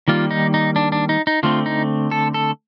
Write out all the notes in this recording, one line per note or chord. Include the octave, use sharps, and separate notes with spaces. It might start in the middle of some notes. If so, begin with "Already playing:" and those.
D#3 G3 A#3 F4
D#4
D#4
D4
D4
D#4
D#4
D3 A3 C4 F4
D#4
A4
A4